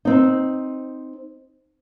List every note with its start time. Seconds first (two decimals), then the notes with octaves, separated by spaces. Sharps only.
0.05 C4 D#4